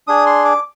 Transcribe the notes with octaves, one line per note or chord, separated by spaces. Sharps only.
D4 G#4 D#6
C6
D6